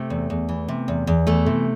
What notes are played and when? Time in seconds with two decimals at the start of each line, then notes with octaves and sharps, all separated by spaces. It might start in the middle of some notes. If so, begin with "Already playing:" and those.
Already playing: C3 A3
0.10 E2
0.30 E2
0.49 E3
0.68 C3
0.88 E2
1.07 E2
1.27 E3 A3
1.46 C3